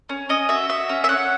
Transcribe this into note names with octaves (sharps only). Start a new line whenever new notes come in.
C#4
C#4 D#5
F#4 E5
F#4 E5
C#4
E5
C#4 F#5